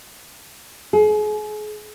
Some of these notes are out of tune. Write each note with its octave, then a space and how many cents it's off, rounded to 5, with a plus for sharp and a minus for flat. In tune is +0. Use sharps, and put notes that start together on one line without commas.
G#4 +35